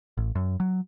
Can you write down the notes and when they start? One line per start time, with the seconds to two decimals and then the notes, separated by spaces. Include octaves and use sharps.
0.17 A1
0.35 F#2
0.60 F#3